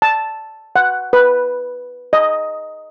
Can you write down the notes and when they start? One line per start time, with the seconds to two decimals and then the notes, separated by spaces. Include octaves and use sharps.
0.02 A5
0.76 F#5
1.13 B4
2.13 D#5